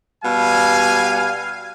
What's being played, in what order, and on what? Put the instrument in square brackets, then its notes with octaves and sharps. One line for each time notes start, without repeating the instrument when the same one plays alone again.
[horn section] B2 G3 F5 G#5